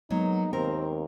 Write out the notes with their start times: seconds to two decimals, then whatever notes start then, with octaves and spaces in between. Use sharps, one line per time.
0.11 F#3 G#3 A#3 B3 D#4
0.53 D#2 C4 A#4